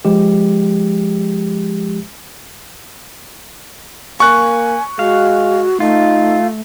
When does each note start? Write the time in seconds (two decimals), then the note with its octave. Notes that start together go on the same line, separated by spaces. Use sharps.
0.05 F3 G#3 G4
4.20 A#3 G#5 C#6 F#6
4.99 G#3 F#4 F5
5.80 A3 D#4 F4